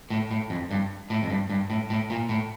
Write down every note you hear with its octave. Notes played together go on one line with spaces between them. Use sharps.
A2
A2
F2
G2
A2
F2
G2
G2
A2
A2
A#2
A2